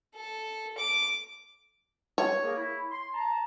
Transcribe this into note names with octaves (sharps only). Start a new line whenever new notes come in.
A4
D6
C#5
A#3 G#4 A#4
E4
C6
A5 A#5